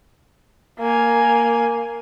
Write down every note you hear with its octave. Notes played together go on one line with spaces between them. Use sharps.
A#3 G#5